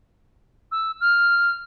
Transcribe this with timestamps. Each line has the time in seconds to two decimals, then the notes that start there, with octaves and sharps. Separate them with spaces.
0.71 E6
1.00 F6